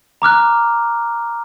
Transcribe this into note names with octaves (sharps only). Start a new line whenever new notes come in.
A#5 D6 F6 F#6